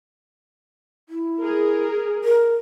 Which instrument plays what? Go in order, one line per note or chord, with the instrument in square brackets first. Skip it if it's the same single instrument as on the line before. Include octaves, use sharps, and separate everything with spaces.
[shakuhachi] E4
[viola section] G#4 A#4
[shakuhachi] A#4